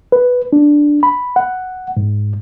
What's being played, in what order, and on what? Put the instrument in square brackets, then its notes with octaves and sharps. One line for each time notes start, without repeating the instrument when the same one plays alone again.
[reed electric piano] B4
D4
B5
F#5
G#2